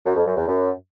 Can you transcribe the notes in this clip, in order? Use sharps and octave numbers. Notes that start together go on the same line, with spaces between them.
F#2
F2
F#2
E2
F#2